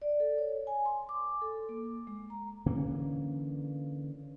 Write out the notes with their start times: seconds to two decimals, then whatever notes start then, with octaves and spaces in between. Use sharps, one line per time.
0.02 D5
0.20 A4
0.38 C#5
0.67 G#5
0.85 C6
1.09 D6
1.42 A4
1.69 A#3
2.07 G#3
2.30 A#5
2.66 D3 E3 A#3 C#4